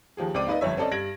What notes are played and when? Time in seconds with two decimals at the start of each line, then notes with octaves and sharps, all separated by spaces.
0.17 D#2 F3 G4 G#4
0.34 C#2 C4 D5 D6 D#7
0.47 A#3 D#4 B4 D5 D#5
0.61 G1 F2 C#5 E5
0.77 C4 C#4 A4 D5 D#5
0.91 G2 G3 G#6 A#6 D7 F#7